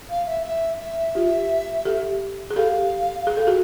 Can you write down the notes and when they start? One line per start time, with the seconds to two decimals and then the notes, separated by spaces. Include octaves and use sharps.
0.10 F5
0.26 E5
0.44 E5
0.79 E5
1.15 F4 G4
1.85 G4 A4
2.51 G#4
2.56 G4 A4 F5
3.27 G#4
3.37 A4
3.47 F#4 G#4